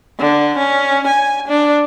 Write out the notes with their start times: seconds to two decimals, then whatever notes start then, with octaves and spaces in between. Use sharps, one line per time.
0.19 D3
0.58 C#4
1.07 G#5
1.48 D4